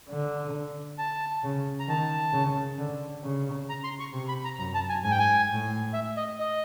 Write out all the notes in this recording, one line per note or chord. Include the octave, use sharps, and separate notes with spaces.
D3
A5
C#3
A#5
D#3 A5
C#3
D3
C#3
A#5
C6
C#6
C3
B5
A#5
F#2 A#5
A5
G#5
G#2 G#5
G5
G#5
A2
E5
D#5
D#5